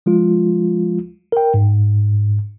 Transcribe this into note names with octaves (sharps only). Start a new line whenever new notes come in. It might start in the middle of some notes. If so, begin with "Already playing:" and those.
F3 G#3 F4
A#4 G5
G#2